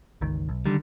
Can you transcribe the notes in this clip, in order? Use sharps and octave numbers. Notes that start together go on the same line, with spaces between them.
G1 C#2 D#3
B1
D3 D#3 G3